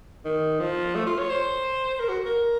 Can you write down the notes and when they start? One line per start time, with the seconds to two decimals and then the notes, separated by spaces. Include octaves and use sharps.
0.25 D#3
0.60 F3
0.95 A3
1.06 F4
1.18 C#5
1.29 C5
2.00 A#4
2.09 F#4
2.26 A#4